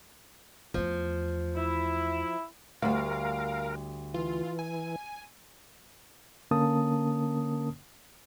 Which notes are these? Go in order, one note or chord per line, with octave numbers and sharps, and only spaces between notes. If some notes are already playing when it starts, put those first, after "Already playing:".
E2 F3 A3
E4
D2 G3 A#4 F5
E3 F4
G#5
D3 A#3 C#4 A#4 A5 D#6